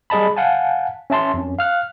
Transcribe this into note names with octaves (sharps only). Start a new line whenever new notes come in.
G3 G#4 D#5 A5 B5
F5 F#5 G#5 A5
C#4 E5 A5 C6
F2 C#4
F5 F6 F#6